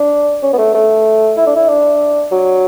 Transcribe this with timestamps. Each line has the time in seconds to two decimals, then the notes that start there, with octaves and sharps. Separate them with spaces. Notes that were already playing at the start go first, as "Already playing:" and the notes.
Already playing: D4
0.43 C#4
0.53 B3
0.58 A3
0.75 A3
1.37 E4
1.47 D4
1.56 E4
1.69 D4
2.32 F#3